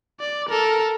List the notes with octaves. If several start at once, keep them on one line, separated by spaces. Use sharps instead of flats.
D5
A4 A#4